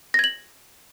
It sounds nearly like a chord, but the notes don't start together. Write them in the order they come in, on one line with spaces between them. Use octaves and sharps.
A#6 G#6 F#7